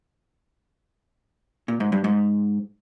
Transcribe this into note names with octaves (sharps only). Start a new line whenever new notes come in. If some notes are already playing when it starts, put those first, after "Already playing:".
A#2
G#2
G2
G#2